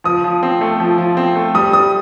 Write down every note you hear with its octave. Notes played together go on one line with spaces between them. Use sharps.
F3 D#6
F3
C4
A3
F3
F3
C4
A3
G3 D#6
G3 D#6